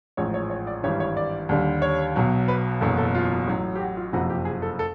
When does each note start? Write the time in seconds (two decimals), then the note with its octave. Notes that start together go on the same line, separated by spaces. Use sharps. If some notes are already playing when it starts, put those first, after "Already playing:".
0.17 A1 G#2 F3 C#5
0.34 C#5
0.50 C#5
0.67 D5
0.83 G#1 G2 E3 G3 C#5
1.00 C#5
1.17 D5
1.49 D#2 D3 G3
1.82 C#5
2.16 B1 B2 F#3
2.48 B4
2.81 F#1 E2 B2 F#3 A4
2.98 A4
3.15 F4
3.47 A1 A2 F#3
3.75 G4
3.80 F#4
3.97 F4
4.12 F#1 F2 C3 F3 F#4
4.30 G4
4.45 G#4
4.62 A4
4.79 A4